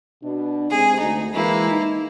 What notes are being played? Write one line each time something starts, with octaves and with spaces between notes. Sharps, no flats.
B2 D4
G#2 C3 G#4
D2 D#4
E3 G#3 A#3 E4
D#4